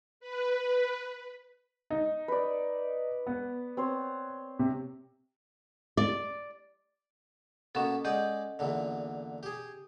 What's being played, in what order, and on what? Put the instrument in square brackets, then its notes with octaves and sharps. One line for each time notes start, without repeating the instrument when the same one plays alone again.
[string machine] B4
[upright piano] D#4
[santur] B4 D5
[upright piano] B3
[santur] C4 C5 C#5
[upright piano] C3
[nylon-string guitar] D5
[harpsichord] B2 A#3 B3 [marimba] C#4 A4
[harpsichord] G#3 D5 [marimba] D#5 F#5 G6
[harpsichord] E2 A#2 D3
G4 G#4